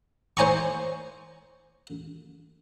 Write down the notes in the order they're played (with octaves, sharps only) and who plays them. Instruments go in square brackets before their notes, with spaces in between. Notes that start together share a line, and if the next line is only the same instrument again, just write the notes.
[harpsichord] C5 C#5 G#5 A#5 C#6